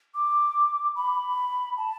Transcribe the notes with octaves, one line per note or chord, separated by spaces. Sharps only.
D6
B5
A5